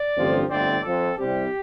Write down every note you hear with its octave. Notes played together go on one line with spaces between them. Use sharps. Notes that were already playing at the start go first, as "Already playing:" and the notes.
Already playing: D5
A1 G2 D3 F3 C4
G1 F2 D3 A3 C4 D5
F2 F3 C4 A4
C2 C3 G3 C4 G4